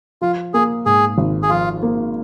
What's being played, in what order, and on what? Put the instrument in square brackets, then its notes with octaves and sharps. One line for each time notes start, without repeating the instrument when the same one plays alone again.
[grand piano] F3 [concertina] F4
[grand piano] A#3 [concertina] G#4
[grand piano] G#2 [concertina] G#4
[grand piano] G#1
[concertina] G#4
[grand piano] F3 [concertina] F4
[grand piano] A#3